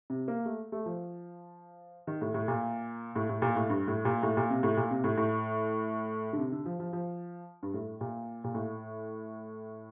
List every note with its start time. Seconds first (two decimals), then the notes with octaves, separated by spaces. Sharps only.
0.10 C3
0.28 A#3
0.45 A3
0.72 A3
0.86 F3
2.07 D#3
2.21 A2
2.34 A2
2.48 A#2
3.16 A2
3.29 A2
3.42 A#2
3.56 A2
3.70 G2
3.88 A2
4.05 A#2
4.23 A2
4.37 A#2
4.50 C3
4.63 A2
4.77 A#2
4.91 C3
5.04 A2
5.18 A2
6.33 D3
6.39 C3
6.52 D3
6.65 F3
6.79 F3
6.93 F3
7.63 G2
7.74 A2
8.01 A#2
8.44 A#2
8.54 A2